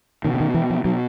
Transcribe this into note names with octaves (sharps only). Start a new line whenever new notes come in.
B2 D#3
D3
D#3
E3
F3
B2 F#3